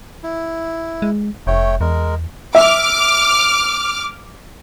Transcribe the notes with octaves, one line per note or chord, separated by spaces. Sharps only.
E4
G#3
F1 A3 C#5 G5
E2 G#3 A#4
E5 D6 F6